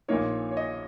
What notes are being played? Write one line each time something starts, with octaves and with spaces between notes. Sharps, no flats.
A#1 A#2 F3 A#3 D#4 C#5
C#5
D#5